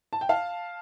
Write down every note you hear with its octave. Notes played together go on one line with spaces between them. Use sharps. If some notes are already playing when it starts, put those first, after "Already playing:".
A5
G5
F5 A5